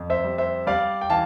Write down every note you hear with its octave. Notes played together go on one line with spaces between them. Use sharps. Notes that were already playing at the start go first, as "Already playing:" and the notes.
Already playing: F2
C5 E5
G3
C5 E5
G3 D5 F5
G5
E3 F5 A5